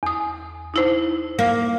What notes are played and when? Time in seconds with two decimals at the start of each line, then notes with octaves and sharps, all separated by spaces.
0.03 E2 D#6
0.74 D#4 E4 C5
1.39 A#3